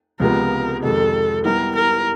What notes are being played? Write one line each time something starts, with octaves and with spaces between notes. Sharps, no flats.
C#2 C3 F3 G#3 B3 A#4
F2 C3 D#3 G#3 A4
G3 B3 E4 G4 A#4
A#4